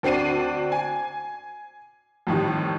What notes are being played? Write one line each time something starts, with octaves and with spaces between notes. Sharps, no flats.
D2 C4 D4 C7 D#7
G#5
F2 A2 D#3 G3